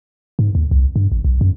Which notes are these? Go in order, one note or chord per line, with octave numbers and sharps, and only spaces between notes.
G#2
D#2
C2
G2
A1
B1
F#2